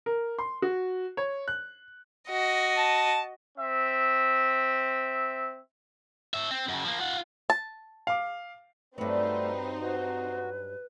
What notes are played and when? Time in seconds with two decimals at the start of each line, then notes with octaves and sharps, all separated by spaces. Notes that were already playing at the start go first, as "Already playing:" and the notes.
0.06 A#4
0.39 C6
0.62 F#4
1.17 C#5
1.48 F#6
2.29 F#4 D#5
2.78 A5
3.58 C4 E5
6.34 C#5 E5
6.51 C4
6.69 F#2 C#3
6.84 F3 A#3
7.00 F4 F#5
7.50 A5
8.07 F5 D6
8.98 G2 F#3 A3 C4 D#4 B4 C5
9.81 F#4 B4